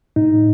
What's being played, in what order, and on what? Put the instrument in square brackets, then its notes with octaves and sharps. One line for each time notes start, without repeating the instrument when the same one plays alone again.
[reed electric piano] A2 D#4